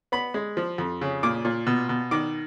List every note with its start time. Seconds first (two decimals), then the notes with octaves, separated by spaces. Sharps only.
0.12 B3 B5
0.34 G#3
0.57 F3
0.78 F2
1.01 C#3
1.23 A#2 D6
1.45 A#2
1.67 B2
1.89 B2
2.11 D#3 D6